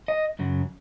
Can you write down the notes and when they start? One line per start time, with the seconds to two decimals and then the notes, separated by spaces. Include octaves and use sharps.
0.08 D#5
0.39 F#2 C#3 F#3